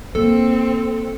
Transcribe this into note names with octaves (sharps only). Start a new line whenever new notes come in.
A#3 C4 A4